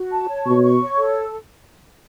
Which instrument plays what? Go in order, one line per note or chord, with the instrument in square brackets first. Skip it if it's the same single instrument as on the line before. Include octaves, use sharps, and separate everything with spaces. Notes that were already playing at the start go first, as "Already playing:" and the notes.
Already playing: [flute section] F#4
A5
C#5
[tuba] B2 [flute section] C#6
[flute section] C#6
C#5
A4